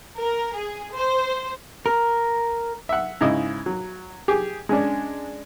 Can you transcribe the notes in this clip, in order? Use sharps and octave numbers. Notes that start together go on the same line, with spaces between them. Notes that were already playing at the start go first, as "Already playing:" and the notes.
A#4
G#4
C5
A#4
E5 F#5
G#2 C#3 E4 D#5
F#3
G4 G#4
G#3 C#4 D4